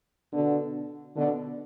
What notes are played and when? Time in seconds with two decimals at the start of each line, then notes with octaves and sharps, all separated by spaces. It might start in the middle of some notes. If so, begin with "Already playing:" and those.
0.33 B2 D3
1.16 B2 D3